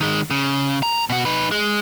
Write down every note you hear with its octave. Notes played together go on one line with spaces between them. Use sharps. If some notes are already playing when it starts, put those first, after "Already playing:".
D#3 G#3
C#3
A#5
B2 F#4
D#4 B4
G#3